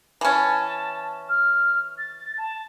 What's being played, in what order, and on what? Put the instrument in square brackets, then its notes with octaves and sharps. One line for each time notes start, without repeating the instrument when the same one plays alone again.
[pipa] E3 C#4 [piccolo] A5
[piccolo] F6
A6
A5